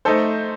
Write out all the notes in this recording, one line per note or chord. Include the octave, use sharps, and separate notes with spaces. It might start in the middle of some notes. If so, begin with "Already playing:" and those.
A3 D#4 A4 C5